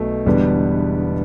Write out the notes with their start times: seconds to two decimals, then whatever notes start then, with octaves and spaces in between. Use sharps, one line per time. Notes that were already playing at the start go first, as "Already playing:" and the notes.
Already playing: B1 B2 A3
0.26 E1 E2 D3 G3 B3